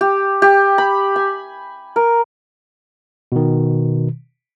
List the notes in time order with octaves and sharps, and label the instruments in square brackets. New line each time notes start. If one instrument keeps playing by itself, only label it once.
[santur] G4
G4
B5
G#5
A#4
[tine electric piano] B2 D#3